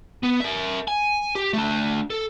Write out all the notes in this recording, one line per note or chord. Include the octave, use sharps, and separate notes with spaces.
B3
A#4 E5
G#5
G4
A3 D4
A4